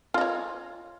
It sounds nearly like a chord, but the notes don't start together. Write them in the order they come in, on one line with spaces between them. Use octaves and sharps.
F4 D#5 C#5